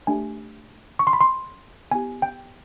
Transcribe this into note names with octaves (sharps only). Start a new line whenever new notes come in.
A3 D4 G4 G#5
C#6
C6
B5
C6
B3 E4 G4 G#5
G5